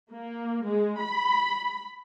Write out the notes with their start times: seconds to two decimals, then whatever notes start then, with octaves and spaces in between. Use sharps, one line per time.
0.12 A#3
0.65 G#3
1.01 B5